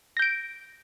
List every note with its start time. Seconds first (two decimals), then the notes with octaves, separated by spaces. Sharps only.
0.17 A#6
0.19 G6
0.22 D7